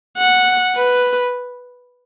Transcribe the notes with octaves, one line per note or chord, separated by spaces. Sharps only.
F#5
B4